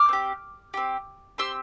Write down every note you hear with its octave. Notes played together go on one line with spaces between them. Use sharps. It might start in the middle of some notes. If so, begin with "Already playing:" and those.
Already playing: D6 F6
C4 G4
C4 G4
C4 G4 C6 E6